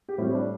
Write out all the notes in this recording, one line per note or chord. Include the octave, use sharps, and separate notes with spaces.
G4
A2 G3 C4 E4
D4